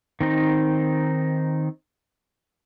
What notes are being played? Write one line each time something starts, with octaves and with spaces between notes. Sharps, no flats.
D#3 C4 D#4